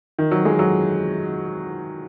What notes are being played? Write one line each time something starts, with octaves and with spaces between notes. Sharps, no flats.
D#3
F#3
G#3
F#3